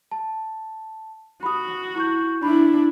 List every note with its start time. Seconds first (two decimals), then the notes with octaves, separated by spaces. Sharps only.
0.11 A5
1.43 F#4 B5 D#6
1.96 E4 C#6 G6
2.43 D4 E4 B5